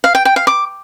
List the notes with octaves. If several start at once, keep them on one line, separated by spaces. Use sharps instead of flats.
F5
G5
G5
F5
D6